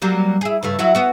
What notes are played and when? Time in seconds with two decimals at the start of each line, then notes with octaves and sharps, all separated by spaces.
0.02 F#3 G3 A#3
0.41 E4 G#4
0.63 G2 C#3 A3
0.79 F#3 E4 F#4
0.95 B3 F#4